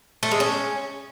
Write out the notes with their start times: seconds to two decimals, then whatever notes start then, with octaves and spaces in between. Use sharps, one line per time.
0.23 A3
0.31 G#3
0.40 C#4